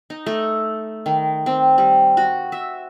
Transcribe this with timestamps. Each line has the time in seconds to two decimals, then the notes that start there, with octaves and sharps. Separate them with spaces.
0.10 D#4
0.26 A3
1.06 D#3
1.46 C4
1.78 G3
2.17 F#4
2.52 E5